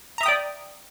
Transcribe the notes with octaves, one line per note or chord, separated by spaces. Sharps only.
D5 E5 G5 A#5 D#6